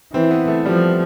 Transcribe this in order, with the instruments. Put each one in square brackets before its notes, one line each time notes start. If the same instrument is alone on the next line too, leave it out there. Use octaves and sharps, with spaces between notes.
[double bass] E3 [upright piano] C4
[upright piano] B3
A3
[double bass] F3 [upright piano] G3